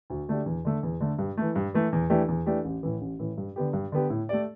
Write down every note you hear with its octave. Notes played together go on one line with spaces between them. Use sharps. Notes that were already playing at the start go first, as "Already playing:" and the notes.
D2
D3 A3 D4 G4
E2
D3 A3
E2
D3 A3
G2
E3 A3
G2
E3 A3
E2
E3 A3 D4 G4
E2
E3 A3 D4 G4
A1
A2 E3
A1
A2 E3
G2
D3 B3 G4
G2
D3 B3 G4
A2
A3 G4 D5